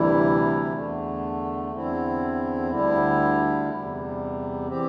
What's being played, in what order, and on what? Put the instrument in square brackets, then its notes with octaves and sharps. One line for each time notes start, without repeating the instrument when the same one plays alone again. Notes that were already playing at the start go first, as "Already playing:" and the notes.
Already playing: [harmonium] D2 C3 E3 G3 E4
E2 D3 A3
E2 D3 C4 E4
D2 D3 G3 E4
E2 C3 G3
E3 C4 G4